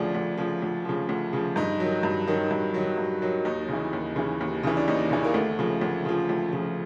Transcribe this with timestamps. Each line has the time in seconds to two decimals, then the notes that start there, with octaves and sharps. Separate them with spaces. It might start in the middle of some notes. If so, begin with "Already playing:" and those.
Already playing: D2 C#3 F3 D4
0.15 D2
0.38 C#3 F3
0.62 D2
0.85 C#3 F3
1.09 D2
1.33 C#3 F3
1.56 G2 D#4
1.80 D#3 F#3
2.03 G2
2.27 D#3 F#3
2.51 G2
2.74 D#3 F#3
2.98 G2
3.22 D#3 F#3
3.45 D#2 D#4
3.69 C#3 E3
3.93 D#2
4.16 C#3 E3
4.41 D#2
4.63 C#3 E3
4.77 D4
4.88 D#2 D#4
5.11 C#3 E3
5.24 A#3
5.34 D2 A3
5.59 C#3 F3
5.81 D2
6.05 C#3 F3
6.29 D2
6.53 C#3 F3